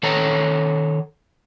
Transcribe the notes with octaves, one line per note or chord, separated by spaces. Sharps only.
D#3 A4 C#5 A5 A#5